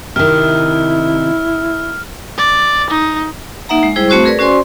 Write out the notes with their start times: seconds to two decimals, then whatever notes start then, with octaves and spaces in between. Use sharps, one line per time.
0.16 C3 D#3 E4 F6
2.38 D5
2.90 D#4
3.69 A#3 D#4 E5 F#5 A#5
3.83 G#3
3.96 G3 E4 G#4 C5
4.09 A3 C4 F#4 C5 C#6
4.25 G#4 A#4 B4 D5
4.39 C#4 F#4 C5 D5 G#5 C6